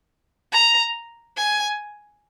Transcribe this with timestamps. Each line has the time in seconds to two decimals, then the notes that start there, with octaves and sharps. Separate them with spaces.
0.52 A#5
1.37 G#5